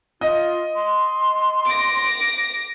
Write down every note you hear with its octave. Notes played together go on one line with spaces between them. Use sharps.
F4 D#5
C6
D6 A#6